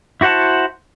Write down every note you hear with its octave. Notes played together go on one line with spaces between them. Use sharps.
E4 F#4 C5 F#5 A5